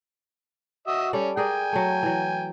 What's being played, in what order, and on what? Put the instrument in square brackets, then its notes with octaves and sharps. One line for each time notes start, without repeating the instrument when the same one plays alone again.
[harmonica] F#4 D#5 E5
[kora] G3 A4 D5 [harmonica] C#4
[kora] G#4 A#4 D5 [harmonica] G5 G#5
[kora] F#3 A3
E3 F#3